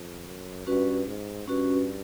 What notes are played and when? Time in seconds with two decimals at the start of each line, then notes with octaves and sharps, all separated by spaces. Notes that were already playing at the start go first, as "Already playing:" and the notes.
Already playing: F2
0.26 F#2
0.67 G2 C#4 F#4 B4
1.07 G#2
1.47 G2 C#4 F#4 B4